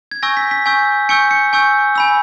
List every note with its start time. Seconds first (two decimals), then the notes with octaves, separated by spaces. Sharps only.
0.11 G#6
0.23 G#5 C#6 E6 G6 A#6
0.37 B6
0.51 B6
0.66 G#5 C#6 E6 G6
1.09 G#5 C#6 E6 G6 C#7
1.31 C#7
1.53 G#5 C#6 E6 G6
1.95 G#5 B5 E6